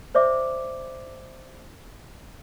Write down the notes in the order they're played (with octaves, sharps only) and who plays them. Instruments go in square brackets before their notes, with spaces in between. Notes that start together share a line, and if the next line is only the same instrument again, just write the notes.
[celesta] C5 D5 E5 D6